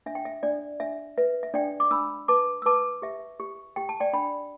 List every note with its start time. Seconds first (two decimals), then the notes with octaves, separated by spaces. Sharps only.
0.06 D4 E5
0.15 G5
0.25 E5
0.43 D4 D5
0.80 D4 E5
1.18 B4 E5
1.43 E5
1.54 D4 D5 G5
1.80 D6
1.91 D4 B5 E6
2.28 B4 A5 D6
2.62 E6
2.66 B4 A5 D6
3.02 G4 E5
3.40 G4
3.76 G4 G5
3.89 A5
4.00 D5 G5
4.13 D4 G5 B5